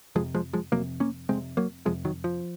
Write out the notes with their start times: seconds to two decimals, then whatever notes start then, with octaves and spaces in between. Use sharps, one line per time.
0.15 F1 F2 C3 F3 G#3
0.35 F3 G#3
0.53 F3 G#3
0.72 F1 F2 C3 F#3 A#3
1.00 A#3 C#4
1.29 F1 F2 C3 G#3 C4
1.57 F#3 A#3
1.85 F1 F2 C3 F3 G#3
2.05 D#3 F#3
2.24 F3